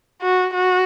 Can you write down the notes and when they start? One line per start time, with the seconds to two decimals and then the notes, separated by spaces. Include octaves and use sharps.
0.22 F#4
0.53 F#4